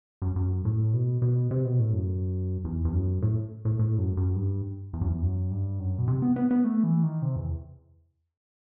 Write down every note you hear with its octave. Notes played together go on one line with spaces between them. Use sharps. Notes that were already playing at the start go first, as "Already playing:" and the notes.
F#2
F#2
A2
B2
B2
C3
B2
A2
F#2
E2
E2
F#2
A2
A2
A2
F#2
F#2
G2
E2
F#2
E2
F#2
G2
F#2
B2
C3
B3
B3
B3
A3
E3
D#3
C3
E2